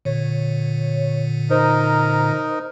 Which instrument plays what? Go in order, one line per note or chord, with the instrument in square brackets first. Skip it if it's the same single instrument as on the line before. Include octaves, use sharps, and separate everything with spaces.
[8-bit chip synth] A#2 D3 [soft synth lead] C#5
[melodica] D#4 A#4 [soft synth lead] C5